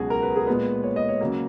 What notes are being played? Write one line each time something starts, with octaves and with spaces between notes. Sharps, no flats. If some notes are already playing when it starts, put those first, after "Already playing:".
Already playing: C#2 B2 F#3 F#4 G#4
A#4
B4
G#4
A#2 G#3 B3 B4
C#5
D#5
C#5
C#3 F#3 A#3